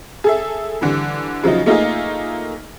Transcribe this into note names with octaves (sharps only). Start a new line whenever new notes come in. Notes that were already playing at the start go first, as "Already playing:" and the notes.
G#4 A4 E5
D3 E3 G3
C#3 F3 F#3 D#4
A3 A#3 D#4 F4 G#4